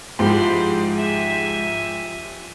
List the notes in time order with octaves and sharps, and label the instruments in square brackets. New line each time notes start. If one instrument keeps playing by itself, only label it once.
[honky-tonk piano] G#2 [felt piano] F3 F4 G4 [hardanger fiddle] E4 C6
[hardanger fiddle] E5 G#5